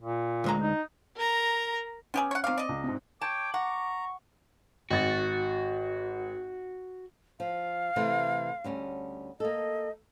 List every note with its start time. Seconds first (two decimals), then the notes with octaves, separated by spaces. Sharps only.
0.01 A#2
0.44 D2 G#3 A#5
0.61 D#4
1.16 A#4 A#5
2.14 B3 C#4 G4 G#4
2.31 C#5 F#5
2.44 D#3 C4 F5 D6
2.57 D5 D#5
2.69 C#2
2.84 G#2 C3
3.21 C#5 G5 A5 D6
3.54 F#5 A#5 C#6
4.91 G#1 F#4 A6
7.40 F3 F5
7.96 C3 E3 A3
8.64 D2 G3 C#4
9.40 A#3 A4 D#5